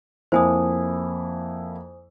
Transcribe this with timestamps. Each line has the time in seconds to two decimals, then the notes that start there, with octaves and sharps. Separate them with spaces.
0.32 F2 A#3 E4 C5 G#5 D#6